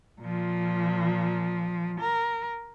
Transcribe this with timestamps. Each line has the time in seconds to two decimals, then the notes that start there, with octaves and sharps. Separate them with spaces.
0.21 A#2 F3
2.00 A#4